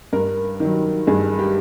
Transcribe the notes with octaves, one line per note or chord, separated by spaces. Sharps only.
G2 A#4
D#3 F#3
G2 G#4
G4